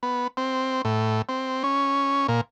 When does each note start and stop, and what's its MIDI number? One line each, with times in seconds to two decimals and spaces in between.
0.03 0.27 59
0.37 0.82 60
0.85 1.22 45
1.29 1.63 60
1.64 2.27 61
2.28 2.41 46